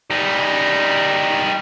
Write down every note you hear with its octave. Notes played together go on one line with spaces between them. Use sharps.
G3 D#4